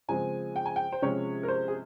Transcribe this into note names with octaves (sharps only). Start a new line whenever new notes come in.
C#3 F3 G#3 C4 G#5
G5
G#5
G5
C5
C3 F3 G#3 C#4 C#5
A#4
C5
G#4